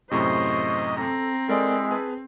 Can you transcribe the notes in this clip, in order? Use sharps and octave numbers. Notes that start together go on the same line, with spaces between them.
F#2 A2 C3 C5 D#5 C#6
C4 A4 A#5
G#3 E4 A4 A#4 D5
G#4 B4 A5